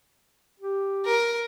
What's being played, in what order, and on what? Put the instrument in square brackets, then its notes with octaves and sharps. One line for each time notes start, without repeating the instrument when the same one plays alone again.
[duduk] G4
[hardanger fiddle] A#4